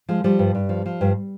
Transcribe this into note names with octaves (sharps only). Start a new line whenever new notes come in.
F3 G#3
F3 G3
G2
G2
F3
F3
G2